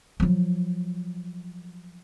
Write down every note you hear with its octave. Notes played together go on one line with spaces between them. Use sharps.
F3 F#3